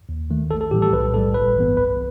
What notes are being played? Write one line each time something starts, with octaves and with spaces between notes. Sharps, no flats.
D#2
D#3 A3
A1 A4
A4
A2 E3 G3 G4
A4
B1 B4
A2 G3 A4
G1 B4
G2 E3 B3
C2 B4